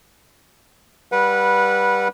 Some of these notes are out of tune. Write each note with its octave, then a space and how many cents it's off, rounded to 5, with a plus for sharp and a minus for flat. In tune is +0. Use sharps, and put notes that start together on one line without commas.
G3 +0 B4 -20 F#5 -25